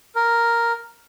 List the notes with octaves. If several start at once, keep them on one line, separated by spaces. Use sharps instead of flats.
A#4